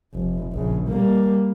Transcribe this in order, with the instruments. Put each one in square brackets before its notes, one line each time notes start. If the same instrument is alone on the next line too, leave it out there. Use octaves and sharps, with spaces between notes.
[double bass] F1
A#1 C#3
G3 A#3